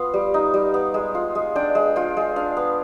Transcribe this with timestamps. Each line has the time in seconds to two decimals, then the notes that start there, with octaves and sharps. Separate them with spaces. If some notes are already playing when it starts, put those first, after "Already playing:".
Already playing: B3 F4 F5
0.14 G3
0.34 D#4
0.54 G3
0.74 B3
0.94 G#3
1.15 F4
1.35 G#3
1.56 D4 G5
1.75 G#3
1.96 F4 G5
2.17 G#3
2.36 D4 F5
2.57 B3